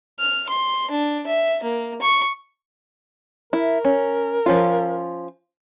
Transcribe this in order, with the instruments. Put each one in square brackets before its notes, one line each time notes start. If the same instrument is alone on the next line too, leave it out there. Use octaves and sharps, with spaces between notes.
[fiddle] F6
C6
D4
E5
A#3
C#6
[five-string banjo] E4 [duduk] A#4
[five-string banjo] C#4
F3 C#4 F4